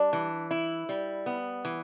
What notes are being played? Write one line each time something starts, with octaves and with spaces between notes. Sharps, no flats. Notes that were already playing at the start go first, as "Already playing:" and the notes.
Already playing: G3 D4
E3
E4
G3
B3
E3